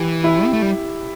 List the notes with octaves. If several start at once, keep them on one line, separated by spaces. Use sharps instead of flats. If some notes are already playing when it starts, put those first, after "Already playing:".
Already playing: E3 G4
E4
C4
A3
G3